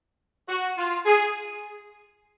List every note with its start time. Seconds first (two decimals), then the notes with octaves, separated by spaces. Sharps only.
0.49 F#4
0.78 F4
1.06 G#4